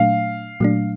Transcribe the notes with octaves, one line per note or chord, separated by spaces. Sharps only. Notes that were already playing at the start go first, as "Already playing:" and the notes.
Already playing: A#2 F#3 A3 D4 F5
A#2 F#3 A3 D4